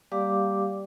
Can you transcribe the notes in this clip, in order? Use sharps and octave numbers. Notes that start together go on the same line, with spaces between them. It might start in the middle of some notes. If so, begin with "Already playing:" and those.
G3 A#3 G4 D5 F5 D6